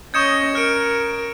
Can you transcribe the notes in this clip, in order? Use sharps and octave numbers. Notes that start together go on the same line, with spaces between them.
C#4 D#5 C#6 D#6 G6 G#6 C#7 E7
A#4 F6 C#7 D7